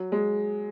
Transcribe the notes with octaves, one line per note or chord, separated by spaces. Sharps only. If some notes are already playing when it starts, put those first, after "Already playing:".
Already playing: F#3
G#3